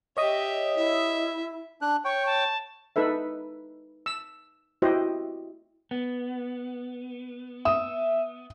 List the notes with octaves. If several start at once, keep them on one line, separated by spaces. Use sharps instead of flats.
G4 C#5 D#5 E5 D#6
E4 E5
D4 F#6
C#5 G5 C#6
A5
D#4 A4 B4 E5
E6
E4 F#4 G4 C5 D#5
B3
E5 D#6